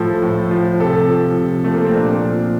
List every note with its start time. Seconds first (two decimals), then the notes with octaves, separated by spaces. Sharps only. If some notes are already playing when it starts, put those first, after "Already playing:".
Already playing: A2 F3 A4
0.22 A2
0.51 F3
0.80 C3 A4
1.09 F3
1.38 C3
1.64 F3 A3
1.74 A#3
1.85 C4
1.95 A#2 D4
2.25 F3